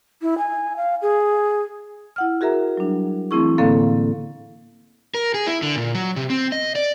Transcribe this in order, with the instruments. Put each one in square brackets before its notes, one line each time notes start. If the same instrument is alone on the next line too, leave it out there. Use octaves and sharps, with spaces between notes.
[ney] E4
G#5
F5
G#4
[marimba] E4 F#5 F6
F#4 G#4 A#4 E5 A#5
F#3 G3 D4
E3 A3 C4 E4 G#4 C#6
A2 D3 A#3 C4 A4 F5
[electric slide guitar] A#4
G#4
E4
D3
A#2
F#3
C3
C4
D#5
D5